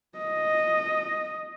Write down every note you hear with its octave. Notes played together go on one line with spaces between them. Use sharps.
D#5